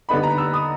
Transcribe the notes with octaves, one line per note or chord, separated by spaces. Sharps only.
D3 G3 B3 D#4 B5
A#5
E6
D#6